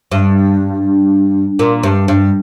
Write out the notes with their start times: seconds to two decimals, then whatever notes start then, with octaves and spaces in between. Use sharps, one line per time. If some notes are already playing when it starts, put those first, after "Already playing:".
0.12 G2
1.59 A#2
1.83 G2
2.08 G2